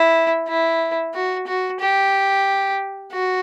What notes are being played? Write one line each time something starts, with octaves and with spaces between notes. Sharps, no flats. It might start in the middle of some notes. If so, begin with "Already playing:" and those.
Already playing: E4
E4
F#4
F#4
G4
F#4